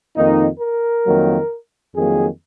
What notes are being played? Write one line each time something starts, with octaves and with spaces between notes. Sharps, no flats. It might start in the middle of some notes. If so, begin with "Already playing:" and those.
F2 D#3 A#3 D#4
A#4
F2 D#3 F#3 A#3
F2 D#3 F#3 A#3 G#4